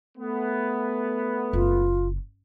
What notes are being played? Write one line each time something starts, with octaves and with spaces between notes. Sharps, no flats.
A3 B3
F#1 F4